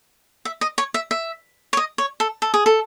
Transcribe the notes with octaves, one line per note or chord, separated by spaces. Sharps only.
E5
D#5
C#5
E5
E5
C#5
D#5
C#5
A4
A4
G#4
A4